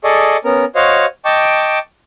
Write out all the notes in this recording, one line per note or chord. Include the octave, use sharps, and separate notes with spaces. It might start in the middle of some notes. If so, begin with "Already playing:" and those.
G#4 A4 D5 D#5 C#6
B3 C#4 A#4
F#4 C5 C#5 D#5 F5
D#5 G5 A5 C#6 D6